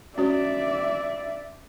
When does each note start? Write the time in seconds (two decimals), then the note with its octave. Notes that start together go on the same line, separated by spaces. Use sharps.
0.18 C#4 F#4 C#5 D5 E5